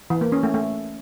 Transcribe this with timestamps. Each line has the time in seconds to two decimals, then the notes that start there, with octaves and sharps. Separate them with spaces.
0.10 E3
0.21 A#3
0.32 C#4
0.43 A3
0.54 A3